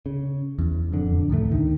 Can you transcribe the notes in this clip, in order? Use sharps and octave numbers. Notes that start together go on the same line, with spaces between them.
C#3
E2
D1 F2 D3
D2 A2 D3 A3
D2 D#3